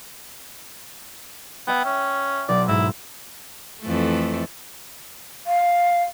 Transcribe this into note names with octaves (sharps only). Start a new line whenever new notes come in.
B3 E5 G5
C#4
B1 D5
G#2 E4
F2 E3 A3
F5